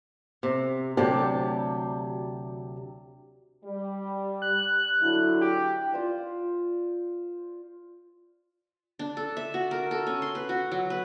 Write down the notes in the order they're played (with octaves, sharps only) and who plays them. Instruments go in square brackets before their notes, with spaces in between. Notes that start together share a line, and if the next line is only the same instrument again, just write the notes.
[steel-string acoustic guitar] C3
D2 C3 F#3 G4 D5 A5
[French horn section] G3
[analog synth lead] F#6
[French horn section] D3 F#3 E4
[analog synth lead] G4
[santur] F4 C5 D5
[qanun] D4
A4
E5
F#4
A#4
A4
C#4
C6
B4
F#4
F#3
B4